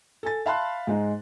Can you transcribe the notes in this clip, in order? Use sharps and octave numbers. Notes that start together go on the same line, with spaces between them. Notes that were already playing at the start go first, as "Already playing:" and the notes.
A4 G#5 A6
E5 F5 A5 B5 C6 F#6
G#2 G#3 D#4